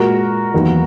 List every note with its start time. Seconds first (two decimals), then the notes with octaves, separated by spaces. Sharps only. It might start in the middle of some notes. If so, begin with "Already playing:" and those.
Already playing: A#2 G#3 F#4 A#4
0.54 E2 D#3 F#3 A#3